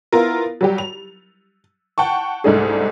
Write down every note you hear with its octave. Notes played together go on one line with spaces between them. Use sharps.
B3 E4 F4 A#4
F#3 G3 G4
F7
F#5 G5 A5 C#6
C2 G#2 A3 D4 D#4 G#4